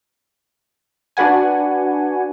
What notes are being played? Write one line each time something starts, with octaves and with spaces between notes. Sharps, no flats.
D4 F#4 B4 F#5 G#5